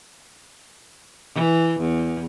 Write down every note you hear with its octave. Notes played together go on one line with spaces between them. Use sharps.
E3
E2